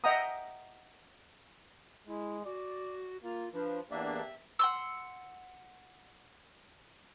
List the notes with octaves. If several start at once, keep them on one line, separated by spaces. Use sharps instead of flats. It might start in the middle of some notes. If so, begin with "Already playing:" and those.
D#5 E5 F#5 G5 A#5 D#6
G#3 E4
F#4 D5
A#3 F4
F3 D4 B4
E2 A#3 D4 G4 E5
F#5 C6 E6